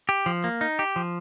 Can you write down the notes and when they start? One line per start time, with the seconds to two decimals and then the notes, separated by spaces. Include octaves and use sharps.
0.09 G4
0.26 F3
0.44 A#3
0.61 D#4
0.79 G4
0.96 F3